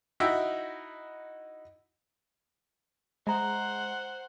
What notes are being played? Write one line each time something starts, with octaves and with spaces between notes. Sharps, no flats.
D#4 E4 F#4 E5 G5
G#3 C5 E5 F#5 A#5